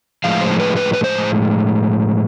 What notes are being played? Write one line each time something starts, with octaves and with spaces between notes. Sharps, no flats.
A2 F3 G#3 F5
C5
B4
B4
B4
C5